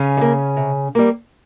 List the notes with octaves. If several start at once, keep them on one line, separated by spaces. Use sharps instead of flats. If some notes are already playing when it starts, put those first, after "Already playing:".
Already playing: C#3 C#4
G3
A#3
C3
G3 A#3